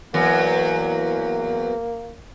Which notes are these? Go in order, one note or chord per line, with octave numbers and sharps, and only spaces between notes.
E2 F#3 A#3